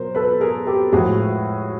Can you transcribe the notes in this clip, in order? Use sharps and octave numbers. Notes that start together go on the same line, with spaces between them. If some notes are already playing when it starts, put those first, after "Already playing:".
Already playing: B2 F#3 A#4 C5
A4 B4
G#4 A#4
G4 A4
A2 F3 G#3 F#4 G#4